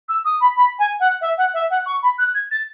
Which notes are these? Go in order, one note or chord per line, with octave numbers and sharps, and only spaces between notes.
E6
D#6
B5
B5
G#5
F#5
E5
F#5
E5
F#5
C#6
B5
F#6
G#6
A6